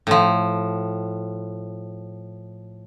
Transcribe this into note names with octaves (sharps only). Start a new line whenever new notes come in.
A2 F3